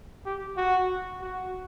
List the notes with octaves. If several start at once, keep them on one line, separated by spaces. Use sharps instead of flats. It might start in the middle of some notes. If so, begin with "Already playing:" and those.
G4
F#4
F#4